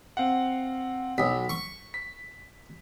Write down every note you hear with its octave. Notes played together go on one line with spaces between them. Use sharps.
C4 F5 F#5
B1 B6
C#6
B6